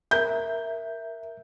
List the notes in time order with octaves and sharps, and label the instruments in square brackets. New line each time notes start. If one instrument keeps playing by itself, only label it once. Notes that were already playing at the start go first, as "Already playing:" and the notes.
[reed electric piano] A#4 E5 [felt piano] G6